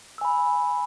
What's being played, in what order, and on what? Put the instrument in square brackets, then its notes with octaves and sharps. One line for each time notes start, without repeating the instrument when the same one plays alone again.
[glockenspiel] E6
G#5
B5